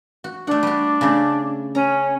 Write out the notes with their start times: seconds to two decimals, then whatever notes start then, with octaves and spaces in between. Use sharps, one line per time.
0.24 F#4
0.47 A3 D4 F#5
0.63 G3 F#4
1.01 C#3 A3
1.75 C#4 A#5